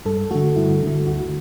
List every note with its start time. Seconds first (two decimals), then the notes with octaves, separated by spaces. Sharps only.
0.05 G2 A4
0.31 D3 A3 F#4
0.56 G2 E4
0.82 D3 A3
1.07 D2 F#4